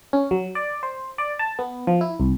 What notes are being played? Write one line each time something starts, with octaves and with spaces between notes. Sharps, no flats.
C#4
F#3
D5
C5
D5
A5
B3
F3
E4
C2